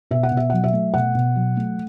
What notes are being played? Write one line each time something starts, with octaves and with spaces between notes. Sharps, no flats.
B2 E5
F#5
B2
E5
F#3 F#5
E5
A3
B2 F#5
B2
F#3
A3